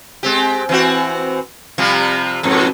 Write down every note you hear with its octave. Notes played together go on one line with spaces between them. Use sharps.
G#3 C4 G4
E3 C4 F#4
C3 F3 G3
F2 G#2 B2